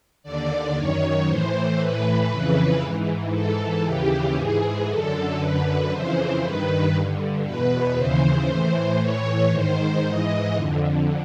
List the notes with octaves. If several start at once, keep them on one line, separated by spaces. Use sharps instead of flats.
D#2 D3 D5
F#2 D#3 C#5
A2 E3 C5
A2 E3 B4
F2 C#3 E3 B4
G#2 E3
G#2 E3 A4
D#2 C#3 E3 G4
G#2 E3 G#4
F#2 D3 A4
F#2 D3 B4
F2 C#3 E3 C5
G2 D#3 B4
G2 D3
E2 B2 B4
D#2 C#3 E3 C5
A2 E3
A2 E3 C#5
G#2 D#3 C5
G#2 E3 D#5
F2 D3